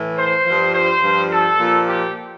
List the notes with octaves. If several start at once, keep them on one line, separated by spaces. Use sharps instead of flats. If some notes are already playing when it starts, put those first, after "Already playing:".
Already playing: A2 E3
C5
G2 F3
C5
G2 F3
A4
A#2 F3
G4